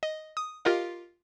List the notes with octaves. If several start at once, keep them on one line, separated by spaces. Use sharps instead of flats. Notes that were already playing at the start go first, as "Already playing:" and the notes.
D#5
D#6
F4 G4 A#4 D#5 F5